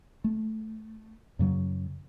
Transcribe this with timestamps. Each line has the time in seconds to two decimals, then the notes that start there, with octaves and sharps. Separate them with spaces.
0.24 A3
1.39 F#2 C#3 F#3